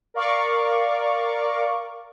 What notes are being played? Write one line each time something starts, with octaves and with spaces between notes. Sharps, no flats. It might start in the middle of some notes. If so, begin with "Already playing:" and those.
A#4 D5 F5 C#6 D6